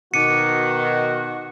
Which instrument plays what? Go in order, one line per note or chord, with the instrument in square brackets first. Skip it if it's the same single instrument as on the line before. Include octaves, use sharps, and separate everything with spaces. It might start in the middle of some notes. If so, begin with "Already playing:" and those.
[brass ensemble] B2 D#3 [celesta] D#4 D6 D#7 [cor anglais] F#4 [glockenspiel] C#7